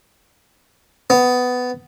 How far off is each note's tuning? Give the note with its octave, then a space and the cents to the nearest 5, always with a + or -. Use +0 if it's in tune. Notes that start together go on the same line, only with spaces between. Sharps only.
B3 +15